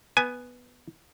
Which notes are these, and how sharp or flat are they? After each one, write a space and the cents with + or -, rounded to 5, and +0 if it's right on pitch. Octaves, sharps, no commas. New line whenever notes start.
B3 +0 G#5 +5